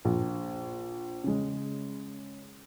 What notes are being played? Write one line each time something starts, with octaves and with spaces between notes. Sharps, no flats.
A#1
C#3 G#3